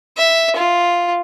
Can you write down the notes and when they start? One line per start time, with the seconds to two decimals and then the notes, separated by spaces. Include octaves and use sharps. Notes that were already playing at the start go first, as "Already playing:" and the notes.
0.17 E5
0.56 F4